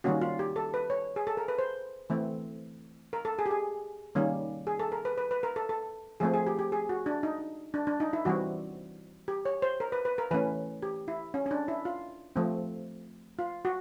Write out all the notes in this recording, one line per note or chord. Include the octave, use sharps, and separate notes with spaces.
D#3 G3 A#3 C#4 F#4
F4
G4
A4
B4
C#5
G#4
A4
A#4
B4
C5
E3 A3 C4
A#4
A4
G#4
G4
G#4
D#3 G3 A#3 C#4
G#4
A4
A#4
B4
B4
B4
A#4
A4
A4
F3 A3 C4 G#4
G#4
G4
G4
G#4
F#4
D4
D#4
D4
D4
D#4
E4
E3 G3 C4 F#4
G4
C#5
C5
A#4
B4
B4
A#4
E3 A3 C#4 B4
G4
E4
C#4
C#4
D4
E4
F4
F3 A3 C4
F4
F#4